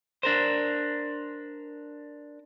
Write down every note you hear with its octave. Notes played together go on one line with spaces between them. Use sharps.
D4 A#4 C5